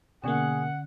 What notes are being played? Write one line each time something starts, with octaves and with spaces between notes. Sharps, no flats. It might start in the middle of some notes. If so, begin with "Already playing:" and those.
B2 D3 A#3 C#4 G#4 F#5